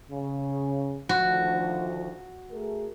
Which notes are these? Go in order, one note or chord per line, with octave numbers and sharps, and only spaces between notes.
C#3
D2 D#3 F3 F#4
A3 G#4 A#4